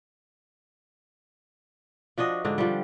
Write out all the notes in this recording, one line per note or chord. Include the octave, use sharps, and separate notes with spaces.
F3 D4 F#4 D#5
G#2 D3 D4
F3 G3